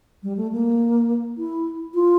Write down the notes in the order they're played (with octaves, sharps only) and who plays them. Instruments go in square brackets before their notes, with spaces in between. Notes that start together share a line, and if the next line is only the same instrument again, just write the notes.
[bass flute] G3
A3
A#3
E4
F4